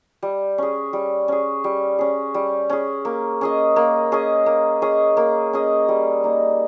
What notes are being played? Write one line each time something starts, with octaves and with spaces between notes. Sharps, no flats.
G3
C#4 G#4
G3
C#4 G#4
G3
C#4 G#4
G3
C#4 G#4
A#3
C#4 G#4 D#5
A#3
C#4 G#4 D#5
A#3
C#4 G#4 D#5
A#3
C#4 G#4 D#5
G3
A#3 D#4